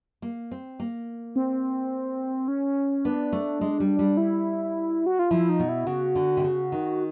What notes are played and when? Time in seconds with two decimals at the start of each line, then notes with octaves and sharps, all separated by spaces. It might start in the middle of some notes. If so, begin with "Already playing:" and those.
0.22 A#3
0.51 C4
0.80 A#3
1.36 C4
2.48 C#4
3.05 B3 D4
3.33 A3
3.61 G#3
3.80 G3
3.99 G3
4.17 E4
5.06 F#4
5.19 F4
5.31 F3 E4
5.49 D#4
5.59 B2
5.69 E4
5.87 C#3 F#4
6.15 D3
6.37 C3
6.44 C#3
6.72 D#3